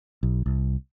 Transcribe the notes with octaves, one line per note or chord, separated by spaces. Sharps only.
B1
C2